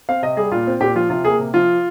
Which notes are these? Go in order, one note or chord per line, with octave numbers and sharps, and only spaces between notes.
C4 F5
C3 D#5
G3 G#4
A#2 F4
C4
A#2 G4
F3 F4
C3 F4
A#3 G#4
C3
F3 F4